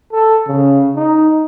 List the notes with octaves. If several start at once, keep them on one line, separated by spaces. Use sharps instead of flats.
A4
C#3
D#4